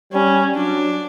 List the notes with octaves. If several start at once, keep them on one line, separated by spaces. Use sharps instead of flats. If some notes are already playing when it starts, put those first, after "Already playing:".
G3 C#4
F#3 D4